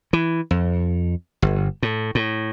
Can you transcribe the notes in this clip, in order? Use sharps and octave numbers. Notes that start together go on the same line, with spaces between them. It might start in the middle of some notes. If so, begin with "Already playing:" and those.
E3
F2
G1
A2
A2